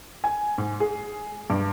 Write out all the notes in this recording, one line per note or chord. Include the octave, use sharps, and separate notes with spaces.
G#5
G#2
G#4
G2